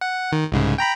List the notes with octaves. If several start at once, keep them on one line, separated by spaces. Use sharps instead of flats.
F#5
D#3
C2 G#2 C#3
G5 A#5 B5